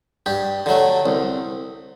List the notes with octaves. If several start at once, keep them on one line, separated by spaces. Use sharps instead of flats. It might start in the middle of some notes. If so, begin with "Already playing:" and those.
G2 G4
D3 F#3 A3
C2